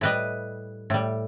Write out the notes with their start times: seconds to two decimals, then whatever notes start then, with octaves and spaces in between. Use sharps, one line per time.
0.01 A2 G3 B4 D#5
0.90 A2 G3